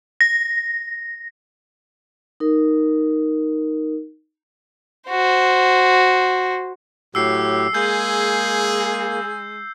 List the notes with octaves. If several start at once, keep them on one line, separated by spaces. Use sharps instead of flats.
A#6
D#4 A#4
F#4 C5
A2 F#3 G4 E6 C7
G#3 A#3 G#4 G6